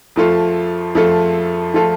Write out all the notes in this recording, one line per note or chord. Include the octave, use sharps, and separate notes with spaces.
F2 F3 A3 F4 A4
F2 F3 A3 F4 A4
F3 A3 F4 A4